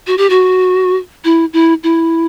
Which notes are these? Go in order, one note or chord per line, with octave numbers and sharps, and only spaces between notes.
F#4
G4
F#4
E4
E4
E4